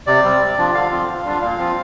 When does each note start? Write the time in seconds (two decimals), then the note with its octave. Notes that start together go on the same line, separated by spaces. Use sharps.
0.07 C3 D5
0.24 G3 C4
0.41 C3
0.57 F3 D4 F4
0.74 D3 F5
0.91 F3 C4 F4
1.08 G2
1.24 D3 G3 D4 F4
1.41 A#2 F5
1.58 F3 C4 F4